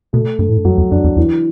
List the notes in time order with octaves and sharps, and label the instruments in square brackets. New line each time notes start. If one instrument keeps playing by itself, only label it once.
[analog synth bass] B2 [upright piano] A3
[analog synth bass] G2 [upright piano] A3
[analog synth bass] A2
G2
[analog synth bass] F#2 [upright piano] F#3
[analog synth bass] E2
[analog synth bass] F#2 [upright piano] D4
[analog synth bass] E2
[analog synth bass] E2 [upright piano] E3